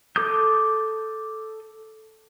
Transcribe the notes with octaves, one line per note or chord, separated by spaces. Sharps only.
A4 D6 D#6 G6